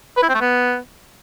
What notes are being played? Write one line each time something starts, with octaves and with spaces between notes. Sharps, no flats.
B4
E4
C4
A3
B3